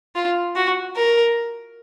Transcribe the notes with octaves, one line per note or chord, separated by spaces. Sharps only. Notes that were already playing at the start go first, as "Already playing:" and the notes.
F4
F#4
A#4